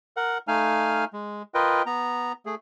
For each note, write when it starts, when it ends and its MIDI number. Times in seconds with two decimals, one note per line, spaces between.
0.17 0.38 70
0.17 0.38 78
0.48 1.05 57
0.48 1.05 63
0.48 1.05 77
0.48 1.05 80
0.48 1.05 89
1.13 1.42 56
1.54 1.82 65
1.54 1.82 70
1.54 1.82 71
1.54 1.82 75
1.54 1.82 79
1.86 2.32 59
1.86 2.32 82
2.46 2.55 57
2.46 2.55 68